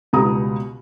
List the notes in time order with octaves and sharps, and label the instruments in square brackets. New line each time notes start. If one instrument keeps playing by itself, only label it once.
[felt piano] C#2 B2 G3 A#5 D#6